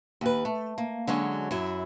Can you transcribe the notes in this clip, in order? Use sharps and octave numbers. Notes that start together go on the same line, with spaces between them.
D#2 B4
A3
A#3
D3 F#3 G#3 C#4
F#2 E4